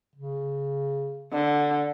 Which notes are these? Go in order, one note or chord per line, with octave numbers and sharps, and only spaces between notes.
C#3
D3